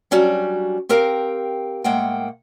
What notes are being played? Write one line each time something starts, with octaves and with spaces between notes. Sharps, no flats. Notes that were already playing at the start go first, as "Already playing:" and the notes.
F#3 G3 C#4 D4 F#4 D5
C4 G4 A#4 F5 G5
A2 G#3 A#3 F#5 G5